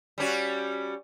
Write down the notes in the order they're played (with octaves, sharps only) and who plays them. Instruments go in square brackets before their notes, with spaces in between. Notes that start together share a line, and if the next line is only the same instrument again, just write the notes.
[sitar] G3 C#4 F#4